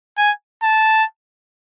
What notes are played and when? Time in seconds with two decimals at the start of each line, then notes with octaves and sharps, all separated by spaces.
0.18 G#5
0.63 A5